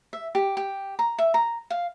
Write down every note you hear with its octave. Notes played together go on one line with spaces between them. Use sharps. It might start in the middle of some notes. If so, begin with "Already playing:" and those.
E5
G4
G4
A#5
E5
A#5
F5